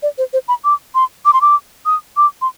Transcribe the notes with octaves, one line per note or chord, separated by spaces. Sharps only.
D5
C5
C5
B5
D6
C6
D6
C6
D6
D#6
D6
C6